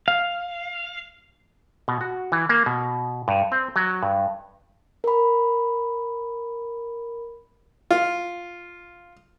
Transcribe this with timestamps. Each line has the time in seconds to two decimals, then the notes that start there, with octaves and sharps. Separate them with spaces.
0.08 F5
1.88 B2
2.01 F#4
2.32 E3
2.49 A#3
2.66 B2
3.28 G2
3.52 C4
3.76 F#3
4.03 G2
5.04 A#4 B5
7.91 F4